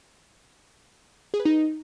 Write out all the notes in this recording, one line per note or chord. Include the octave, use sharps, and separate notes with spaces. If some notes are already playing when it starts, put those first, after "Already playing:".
G#4
B4
D#4